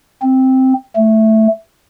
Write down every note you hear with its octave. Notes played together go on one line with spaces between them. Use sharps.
C4
A3